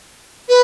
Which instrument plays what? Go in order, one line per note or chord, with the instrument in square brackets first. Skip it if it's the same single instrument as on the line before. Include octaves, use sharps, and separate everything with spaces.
[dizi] B4